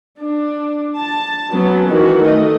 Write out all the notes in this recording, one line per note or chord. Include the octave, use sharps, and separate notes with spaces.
D4
A5
F#3 B3 C#4
D#3 E3 F#4
A3 D#5